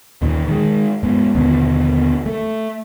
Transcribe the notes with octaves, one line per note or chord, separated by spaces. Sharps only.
D#2 A#2 D#3
D#3 G#3
G2 G#3 B3
D#2 B2 D3 B3
A3